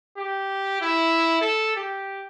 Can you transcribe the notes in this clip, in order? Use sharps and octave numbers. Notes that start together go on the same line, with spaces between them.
G4
E4
A4
G4